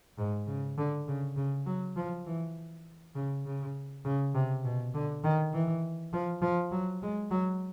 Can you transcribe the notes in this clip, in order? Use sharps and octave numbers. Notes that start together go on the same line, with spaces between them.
G#2
C#3
D3
C#3
C#3
F#3
F3
E3
C#3
C#3
C#3
C3
B2
D3
D#3
E3
F3
F3
F#3
G#3
F#3